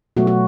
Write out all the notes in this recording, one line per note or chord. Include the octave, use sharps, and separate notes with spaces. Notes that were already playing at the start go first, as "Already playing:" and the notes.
B2 F#3 A3 F#4
F#4